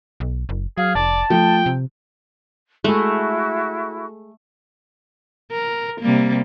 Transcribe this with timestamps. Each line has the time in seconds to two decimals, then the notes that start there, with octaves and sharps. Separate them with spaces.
0.20 B1
0.49 F#1
0.78 F#3 G#4 F5
0.95 F1 D5 A5
1.30 F3 A3 G5
1.66 C3
2.84 G#3 A3 E4 F#4 G#4
5.52 A#4
6.02 C3 G3 A#3